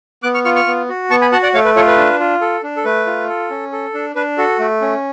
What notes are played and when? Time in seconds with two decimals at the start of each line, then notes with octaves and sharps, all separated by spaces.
0.23 B3 D6 F#6
0.34 C#6 F6
0.45 F4 C#6 F6
0.56 C#6 F6
0.67 B3
0.89 F#4
1.10 B3 A5 C#6
1.21 G#5 B5
1.32 F#4 F#5 A5
1.43 D5 F#5
1.54 A3 C#5 F5
1.65 B4
1.76 F4 A4 C#5
1.87 B4
1.98 D4
2.20 F4
2.41 A4
2.63 D4
2.77 A4
2.85 A3 B4
3.06 F4
3.29 A4
3.50 C#4
3.72 A4
3.94 D4
4.16 D4 B4
4.38 F#4 A4
4.59 A3
4.81 C#4